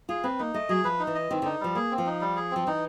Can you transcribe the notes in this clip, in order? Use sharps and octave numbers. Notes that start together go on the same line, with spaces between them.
F4 G#4
C4 B4
A#3 D#4
A3 D#5
F#3 G#4
F3 B4
D#4
E3
D#5
D#3 C4
D3 D#4
F3 G3
A#3 G#4
C4
F3
D#4
G3
G#4
F3 C4
E3 D#4